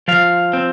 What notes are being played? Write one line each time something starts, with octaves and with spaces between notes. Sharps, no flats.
F3 F5
C4